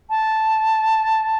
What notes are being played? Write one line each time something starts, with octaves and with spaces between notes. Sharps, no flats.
A5